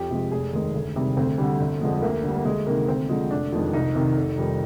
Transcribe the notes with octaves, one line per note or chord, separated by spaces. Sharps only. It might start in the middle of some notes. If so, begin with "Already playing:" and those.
Already playing: F2 G4
C3 F3 G#3
F1 G#4
D#2 D#3 G#3
D2
C3 D#3 G3
D2 C4
D3 G3
G1
F2 D3 G#3
D2 A#3
D3 G3
A#3
D2 G#3
C3 D#3 A#3
D2 C4
D3 F3 G#3
F1 D4
F2 D#3 G#3
C2 D#4
C3 D#3
F1
F2 D#3 G3